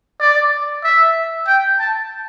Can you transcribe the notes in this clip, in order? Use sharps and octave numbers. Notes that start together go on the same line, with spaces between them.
D5
E5
G5
A5